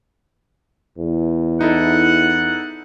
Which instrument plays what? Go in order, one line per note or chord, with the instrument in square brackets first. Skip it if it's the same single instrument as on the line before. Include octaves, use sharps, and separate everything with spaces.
[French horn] E2
[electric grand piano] D#4 E4 A4 [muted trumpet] F#5